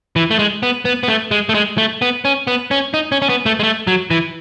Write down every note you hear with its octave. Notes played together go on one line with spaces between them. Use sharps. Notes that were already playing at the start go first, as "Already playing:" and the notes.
E3
A3
G#3
B3
B3
B3
A3
G#3
A3
G#3
A3
B3
C#4
B3
C#4
D#4
C#4
C#4
B3
A3
G#3
A3
F#3
E3